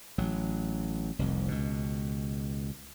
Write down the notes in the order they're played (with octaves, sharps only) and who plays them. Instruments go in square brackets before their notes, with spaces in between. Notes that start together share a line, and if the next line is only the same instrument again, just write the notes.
[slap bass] A1 F#3
F1 C2 F2
C#2 B2